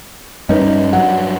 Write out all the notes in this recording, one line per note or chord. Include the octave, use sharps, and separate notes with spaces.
G2 G3 C#4 D#4 B4
G2 F#3 F#5